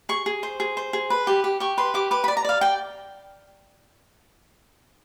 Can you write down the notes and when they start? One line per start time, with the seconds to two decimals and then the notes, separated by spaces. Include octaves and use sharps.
0.09 G#4 C#6
0.26 G#4
0.43 C5
0.60 G#4
0.77 C5
0.93 G#4
1.10 B4
1.27 G4
1.44 G4
1.60 G4 C#6
1.78 B4 C6
1.94 G4 D6
2.11 B4 D6
2.24 B5
2.28 D5
2.37 A#5
2.44 D5 F5
2.61 D5 G5